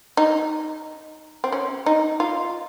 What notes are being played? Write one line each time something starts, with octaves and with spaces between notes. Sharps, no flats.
D#4
C4
C#4
D#4
F4